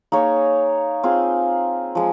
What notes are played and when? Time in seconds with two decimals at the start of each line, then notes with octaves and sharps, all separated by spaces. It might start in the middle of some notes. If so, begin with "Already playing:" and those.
0.12 A#3 D#4 G#4 C#5
1.03 C4 F4 G#4
1.95 F3 G#3